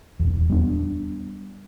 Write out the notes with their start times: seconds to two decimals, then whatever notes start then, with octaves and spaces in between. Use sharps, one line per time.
0.20 D#1 E2
0.50 G3 B3 D4